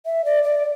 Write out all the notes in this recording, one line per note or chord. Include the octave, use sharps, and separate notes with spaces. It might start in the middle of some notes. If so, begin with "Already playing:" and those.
E5
D5
D5